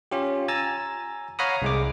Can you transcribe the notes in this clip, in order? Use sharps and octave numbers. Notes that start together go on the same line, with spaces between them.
C#4 F4 G4
G#5 A#5 E6 A6
C#5 F5 F#5 A#5 B5 D#6
C2 G#3 D6